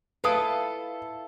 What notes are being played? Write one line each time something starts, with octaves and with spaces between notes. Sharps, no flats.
E4 F4 A4 B4 D#6